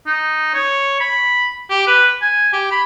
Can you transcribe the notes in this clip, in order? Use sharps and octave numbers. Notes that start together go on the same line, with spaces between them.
D#4
C#5
B5
G4
B4
G#5
G4
B5